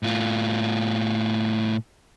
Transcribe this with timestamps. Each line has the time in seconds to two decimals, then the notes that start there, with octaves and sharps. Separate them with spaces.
0.03 A2 F4